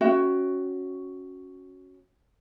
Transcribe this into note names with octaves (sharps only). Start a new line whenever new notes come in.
C#4 F#4 E5 G5